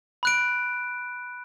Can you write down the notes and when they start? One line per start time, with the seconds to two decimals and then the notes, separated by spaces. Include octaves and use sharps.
0.23 B5 F#6 D7